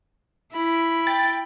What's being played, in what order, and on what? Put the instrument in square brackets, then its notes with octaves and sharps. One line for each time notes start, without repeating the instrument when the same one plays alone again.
[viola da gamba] E4 [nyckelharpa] B5
[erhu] G5 [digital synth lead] A6